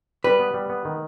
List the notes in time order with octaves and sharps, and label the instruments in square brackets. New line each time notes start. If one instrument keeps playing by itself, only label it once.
[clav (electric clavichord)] G3 [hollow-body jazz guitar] B4
[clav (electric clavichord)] B3
G3
B3
D#3